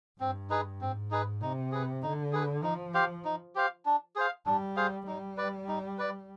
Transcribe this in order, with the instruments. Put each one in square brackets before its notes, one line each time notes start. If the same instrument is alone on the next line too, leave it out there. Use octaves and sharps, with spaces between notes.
[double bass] G2 [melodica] C4
[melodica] D#4 G#4 B4
[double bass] G#2 [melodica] C4
[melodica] D#4 G#4 B4
[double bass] C3 [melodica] D#4
[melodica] G#4 B4
[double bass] D3 [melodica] D#4
[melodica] G#4 B4
[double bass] F3 [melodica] D#4
[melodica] G4 C5 F5
D#4
G4 C5 F5
D4
G#4 C5 F5
[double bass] G3 [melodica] D4
[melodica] G#4 C5 F5
[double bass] G3 [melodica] D#4
[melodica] B4 D5
D#4
B4 D5